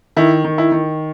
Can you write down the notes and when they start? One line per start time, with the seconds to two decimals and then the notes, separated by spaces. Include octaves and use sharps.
0.17 D#3 E4
0.44 D#3
0.58 E4
0.72 D#3